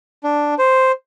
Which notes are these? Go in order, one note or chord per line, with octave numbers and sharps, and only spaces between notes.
D4
C5